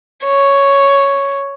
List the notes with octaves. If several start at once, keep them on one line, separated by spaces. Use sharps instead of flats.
C#5